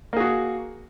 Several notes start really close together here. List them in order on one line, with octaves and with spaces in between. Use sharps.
A#3 G#4 F#4